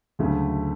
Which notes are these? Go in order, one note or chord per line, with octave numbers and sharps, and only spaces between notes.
D2 C#3 F#3 A3